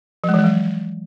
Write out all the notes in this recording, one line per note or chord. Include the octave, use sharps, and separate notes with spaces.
F3
G#3
E3
G#3
F#3